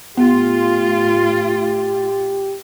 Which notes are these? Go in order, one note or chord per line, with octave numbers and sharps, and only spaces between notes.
A2 B3 F4 G4